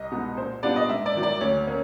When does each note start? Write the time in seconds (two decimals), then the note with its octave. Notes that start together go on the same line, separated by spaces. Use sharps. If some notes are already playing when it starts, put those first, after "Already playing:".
Already playing: C2 D#5
0.11 B2 G#3 B3 D#4
0.37 A#2 C5
0.63 G3 B3 D4 F4 D5
0.76 D#5
0.89 G#2 E5
1.06 D5
1.15 D#3 F#3
1.23 D5
1.41 D2 C#5
1.67 A#3 C#4